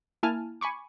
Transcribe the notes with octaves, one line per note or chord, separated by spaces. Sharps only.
A#3 E4 G#5 A5 F6
G#5 B5 C#6 D6